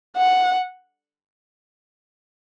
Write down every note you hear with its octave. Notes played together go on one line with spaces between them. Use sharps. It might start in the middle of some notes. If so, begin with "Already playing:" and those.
F#5